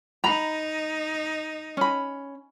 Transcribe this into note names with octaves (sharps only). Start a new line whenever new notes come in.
D#4 A#5 B5
C#4 B5